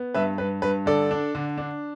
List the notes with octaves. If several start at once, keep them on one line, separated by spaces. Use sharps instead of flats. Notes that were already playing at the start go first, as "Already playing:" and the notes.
Already playing: B3
G2 B4 E5
G2 B4
G2 B4
D3 A4 D5
D4
D3
D4